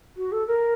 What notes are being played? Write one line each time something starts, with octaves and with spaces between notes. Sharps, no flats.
F#4
A4
A#4